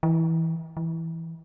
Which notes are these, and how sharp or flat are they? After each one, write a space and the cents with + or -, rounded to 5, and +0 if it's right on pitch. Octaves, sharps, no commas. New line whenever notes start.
E3 -15
E3 -5